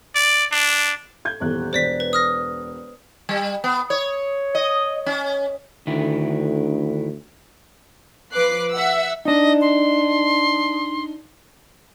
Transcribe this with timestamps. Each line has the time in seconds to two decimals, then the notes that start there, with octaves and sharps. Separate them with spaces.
0.15 D5
0.52 D4
1.25 G6 G#6
1.40 D#1 E2 F#6
1.73 E1 C5 D5 B6
2.00 B4
2.13 D#6 F6 A#6
3.29 G3
3.64 B3
3.90 C#5
4.55 D#5
5.06 C#4
5.87 D2 D3 D#3 E4
8.32 F3 B4 D6 F#6 C7
8.72 E5 F#5 E6
9.25 D4 D#4 D#5
9.61 C6